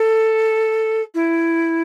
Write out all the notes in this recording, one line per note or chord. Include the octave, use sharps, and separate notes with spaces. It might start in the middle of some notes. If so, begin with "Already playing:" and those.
Already playing: A4
E4